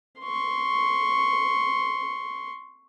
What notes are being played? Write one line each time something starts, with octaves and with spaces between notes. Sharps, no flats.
C6 C#6